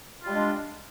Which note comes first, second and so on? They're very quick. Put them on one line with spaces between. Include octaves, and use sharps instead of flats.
F4 G3 G#3 D4